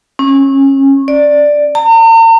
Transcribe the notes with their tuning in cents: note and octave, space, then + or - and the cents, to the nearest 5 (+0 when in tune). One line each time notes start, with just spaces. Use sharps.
C#4 -25
D5 +5
A#5 -45